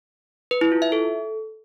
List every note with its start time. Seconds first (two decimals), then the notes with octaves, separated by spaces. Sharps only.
0.51 B4
0.61 E4
0.72 F4
0.82 E5
0.92 A4